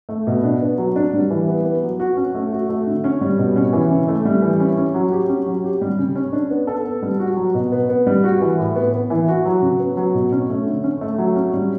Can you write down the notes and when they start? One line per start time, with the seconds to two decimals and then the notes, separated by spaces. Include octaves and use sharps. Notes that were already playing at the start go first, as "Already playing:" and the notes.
0.09 A3
0.27 B2
0.44 D4
0.62 B3
0.78 F#3
0.96 D4
1.14 G3
1.30 E3
1.48 B3
1.65 B3
1.83 F#3
2.00 F#4
2.17 C#4
2.35 A3
2.52 F#4
2.69 A3
2.87 D3
3.04 C#4
3.21 G3
3.38 B2
3.56 C#4
3.73 E3
3.91 C#3
4.08 A3
4.25 G3
4.42 E3
4.60 C#4
4.77 C#4
4.94 F#3
5.12 G4
5.29 C#4
5.46 F#3
5.64 G4
5.82 G3
5.99 C#3
6.15 C#4
6.33 D4
6.50 B3
6.67 A4
6.85 B3
7.03 G3
7.19 F#4
7.37 F#3
7.54 B2
7.72 B3
7.89 B3
8.07 G3
8.24 F#4
8.41 E3
8.59 A2
8.76 B3
8.93 B3
9.10 E3
9.28 F#4
9.45 F#3
9.62 C#3
9.80 B3
9.97 F#3
10.14 B2
10.32 C#4
10.50 A3
10.66 D3
10.84 C#4
11.01 A3
11.18 F#3
11.36 C#4
11.53 G3